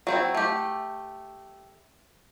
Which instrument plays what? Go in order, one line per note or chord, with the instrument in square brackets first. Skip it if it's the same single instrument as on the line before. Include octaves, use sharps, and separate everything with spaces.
[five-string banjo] F#3 C4 E4
A3 G4